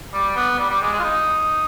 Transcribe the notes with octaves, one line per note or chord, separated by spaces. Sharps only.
G3
B3
G3
G3
G#3
G#3
F4
D#4